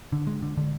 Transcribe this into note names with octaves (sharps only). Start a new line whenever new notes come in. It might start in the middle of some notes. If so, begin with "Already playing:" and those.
D3
G#3
D3
D3